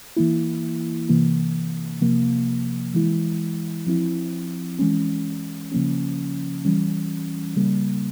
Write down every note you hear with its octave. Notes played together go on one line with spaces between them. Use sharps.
E3 A#3 E4
C3 E3 A#3
C3 F3 A#3
E3 G#3 E4
F3 C4 E4
E3 G#3 C#4
C#3 F3 A#3 C#4
E3 G3 C#4
C#3 G3 A#3